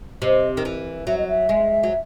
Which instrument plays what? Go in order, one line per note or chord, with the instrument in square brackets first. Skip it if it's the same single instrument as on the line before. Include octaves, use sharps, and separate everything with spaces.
[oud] C3 [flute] D#5
[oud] D#3
E3
[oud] F#3 [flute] E5
[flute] D#5
E5
[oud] G#3
F#3